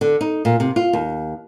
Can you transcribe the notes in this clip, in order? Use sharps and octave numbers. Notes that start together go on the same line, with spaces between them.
D3
D#4
A#2
C3
F4
D#2